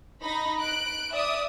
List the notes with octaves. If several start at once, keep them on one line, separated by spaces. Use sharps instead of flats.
D#4 B5 A#6
F#6 D7
D5 E5 D#6